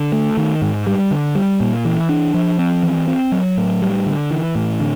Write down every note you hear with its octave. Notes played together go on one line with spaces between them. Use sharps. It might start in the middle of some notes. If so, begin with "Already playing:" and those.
Already playing: D3
A3
D#3
G#2
G3
D3
G3
A#2
E3
D4
F3
C4
E3
C4
F#3
A2
G3
D3
E3
A2
D3